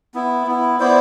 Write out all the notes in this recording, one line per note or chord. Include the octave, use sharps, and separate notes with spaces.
B3 E4
B3 E4
B3 E4 C5 D5